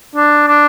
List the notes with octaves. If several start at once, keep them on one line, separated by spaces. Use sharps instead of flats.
D4
D4